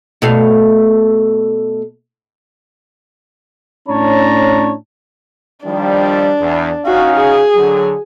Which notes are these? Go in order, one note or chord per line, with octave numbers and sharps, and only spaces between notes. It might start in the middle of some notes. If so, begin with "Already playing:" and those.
B2 A3 F5
A2 C#4 D4 C#5 A5 A#5
D#3 F3 G3 D4
E2
C#4 D#4 F#4 F5
G#4
D3 F#3